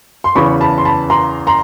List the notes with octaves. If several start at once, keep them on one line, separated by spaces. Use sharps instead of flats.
C6
E2 C#3 E3 B5 C#6
A5 B5
C6
A5 B5
A#5 C6
A#5 C6